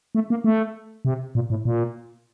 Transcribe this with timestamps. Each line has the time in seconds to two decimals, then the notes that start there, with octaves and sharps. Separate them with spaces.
0.15 A3
0.30 A#3
0.44 A3
1.05 C3
1.35 A#2
1.50 A2
1.65 A#2